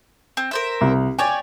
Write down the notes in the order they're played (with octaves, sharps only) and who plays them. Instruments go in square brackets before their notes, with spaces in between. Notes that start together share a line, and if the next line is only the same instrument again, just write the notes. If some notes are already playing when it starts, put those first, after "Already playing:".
[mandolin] C4
A#4 C5 E5
[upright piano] C2
[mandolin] G4 C#5 D5 [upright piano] G#5